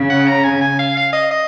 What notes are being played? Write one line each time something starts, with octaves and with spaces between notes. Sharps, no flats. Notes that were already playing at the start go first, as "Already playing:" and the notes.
Already playing: C#3
F#5
A#5
G#5
G#5
F5
F5
D#5
D#5